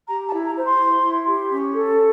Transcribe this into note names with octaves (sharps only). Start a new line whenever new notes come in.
G4 A#5
A5
E4
A#5
C5
C6
E4
E4
G4
C#4
A4